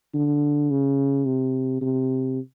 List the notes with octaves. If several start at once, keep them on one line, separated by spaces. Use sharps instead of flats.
D3
C#3
C3
C3